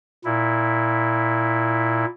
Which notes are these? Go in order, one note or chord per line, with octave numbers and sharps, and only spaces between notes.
A#2 E4